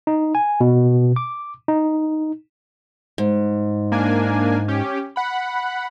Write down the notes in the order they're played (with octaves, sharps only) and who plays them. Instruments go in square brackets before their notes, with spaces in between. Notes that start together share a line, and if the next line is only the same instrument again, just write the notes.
[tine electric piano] D#4
G#5
B2
D6
D#4
[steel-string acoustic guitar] G#2
[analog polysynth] A#3 D4 G#5
C#4 G4
F#5 B5